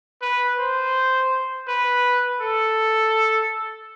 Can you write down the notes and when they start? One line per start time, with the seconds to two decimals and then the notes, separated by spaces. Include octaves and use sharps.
0.22 B4
0.58 C5
1.68 B4
2.41 A4